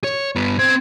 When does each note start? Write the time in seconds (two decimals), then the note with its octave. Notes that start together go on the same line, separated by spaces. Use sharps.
0.04 C#5
0.36 G2 B3
0.59 C4 C5 G#6